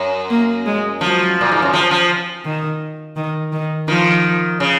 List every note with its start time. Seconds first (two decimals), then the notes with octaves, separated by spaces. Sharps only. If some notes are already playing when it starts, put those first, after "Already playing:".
Already playing: F#2
0.30 A#3
0.66 G#3
1.01 F3 F#3
1.41 A#2
1.51 G#2
1.62 F#2
1.73 F3
1.91 F3
2.45 D#3
3.16 D#3
3.52 D#3
3.88 D#3 F3
4.60 C#3